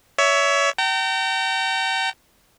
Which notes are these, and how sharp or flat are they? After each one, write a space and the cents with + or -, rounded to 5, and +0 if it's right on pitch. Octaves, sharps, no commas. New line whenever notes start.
C#5 +25 E5 +0
G5 -35 A#5 -40